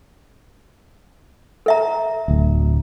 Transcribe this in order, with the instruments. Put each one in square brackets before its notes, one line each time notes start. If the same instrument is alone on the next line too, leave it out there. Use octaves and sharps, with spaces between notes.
[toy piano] A4 E5 A#5
[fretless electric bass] D1 D2